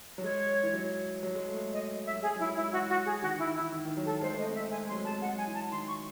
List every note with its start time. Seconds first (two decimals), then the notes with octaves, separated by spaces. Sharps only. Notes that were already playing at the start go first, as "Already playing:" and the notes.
0.18 F#3
0.24 G#3 C#5
0.63 E3
0.73 F#3
1.23 F#3
1.35 G#3
1.49 A3
1.61 A3
1.73 D#5
2.06 E5
2.12 F#3
2.22 G#3 G#4
2.36 F#3
2.40 E4
2.47 G#3
2.56 E4
2.60 G#3
2.72 E3 F#4
2.89 F#4
3.06 G#4
3.22 D#3 F#4
3.34 D#3
3.39 E4
3.47 E3
3.56 E4
3.60 E3
3.72 D#3
3.85 D#3
3.97 F#3
4.06 A4
4.09 F#3
4.21 G#3 C5
4.34 A3
4.39 D#5
4.47 C4
4.55 E5
4.59 C4
4.71 G#3 G#5
4.85 A3
4.88 C6
4.91 F#3
4.96 G#3
5.05 A5
5.09 G#3
5.22 G#3 F#5
5.34 F#3 G#5
5.47 E3
5.54 A5
5.71 D#3 C6
5.88 C#6